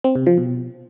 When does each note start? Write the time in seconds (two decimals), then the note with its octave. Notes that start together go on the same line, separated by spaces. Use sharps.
0.04 C4
0.15 C3
0.27 F3
0.38 B2